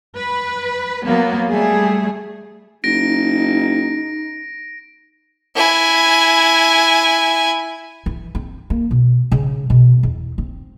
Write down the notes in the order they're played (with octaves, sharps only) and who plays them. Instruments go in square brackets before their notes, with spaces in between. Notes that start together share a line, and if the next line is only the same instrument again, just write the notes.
[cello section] B4
F#3 A#3 B3
G3 A3 G#4
[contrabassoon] F#1 [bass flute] D#4 [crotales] A#6 D7
[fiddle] E4 G#5
[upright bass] E3
C4
A#3
B2
C#3
B2
E2
C4